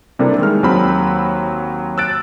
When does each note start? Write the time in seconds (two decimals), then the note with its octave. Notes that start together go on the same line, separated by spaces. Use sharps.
0.19 C3 G3 A#3 D4 E4 A4
0.39 D#3 G#3 F6
0.63 D#2 F#3 C4 B5 E6
1.98 E6 F#6 A6 D7